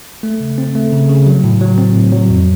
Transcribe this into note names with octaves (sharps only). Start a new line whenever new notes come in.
A3
C#3
C4
A3
C#3
C#3
F#3
A2
F#3
C4
A2
F#3
F2